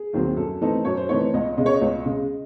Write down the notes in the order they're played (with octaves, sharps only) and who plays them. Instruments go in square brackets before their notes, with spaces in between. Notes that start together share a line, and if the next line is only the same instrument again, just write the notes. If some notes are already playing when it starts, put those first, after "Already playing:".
Already playing: [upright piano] G#4
D#2 D#3 F#3 C4
F#2 A4
E3 A3 C4 D#4 A4
F#2 C#5
C5
E3 A3 C4 D#4 C#5
C#2 D#5
C#3 G#3 D#5
C#5
D#5
C#2
C#3 G#3